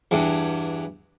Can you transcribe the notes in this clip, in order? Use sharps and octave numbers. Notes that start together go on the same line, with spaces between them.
E2 G2